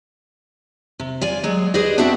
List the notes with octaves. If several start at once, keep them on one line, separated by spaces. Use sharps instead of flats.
C3
F4 D5 G#5
F#3 G#3
G#4 B4 C5 D5 D#5
B3 C4 D4 F#4 E5 A5